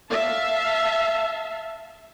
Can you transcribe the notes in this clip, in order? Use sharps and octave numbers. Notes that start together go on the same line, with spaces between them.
E5 F5 A5